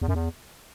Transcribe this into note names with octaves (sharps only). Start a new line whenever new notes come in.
E2
F#2
E2